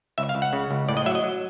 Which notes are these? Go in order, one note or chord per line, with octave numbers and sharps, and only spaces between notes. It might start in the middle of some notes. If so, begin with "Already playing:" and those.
C#2 E5
F5
C#2
F#5
C#3
C#2
A2 D5
D#5
F#3 E5
D#5
F#3